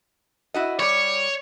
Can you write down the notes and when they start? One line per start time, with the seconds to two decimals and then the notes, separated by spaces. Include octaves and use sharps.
0.54 E4 F#4 D#5
0.80 G3 C#5 D5